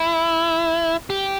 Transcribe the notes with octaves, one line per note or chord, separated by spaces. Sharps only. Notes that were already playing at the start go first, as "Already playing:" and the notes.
Already playing: E4
G4